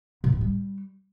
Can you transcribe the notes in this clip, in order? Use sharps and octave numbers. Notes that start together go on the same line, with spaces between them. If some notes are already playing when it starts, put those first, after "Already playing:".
A#2
A2
G3